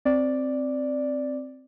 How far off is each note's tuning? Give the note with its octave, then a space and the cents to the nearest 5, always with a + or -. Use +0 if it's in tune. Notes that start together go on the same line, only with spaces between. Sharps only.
C4 +0 D5 +0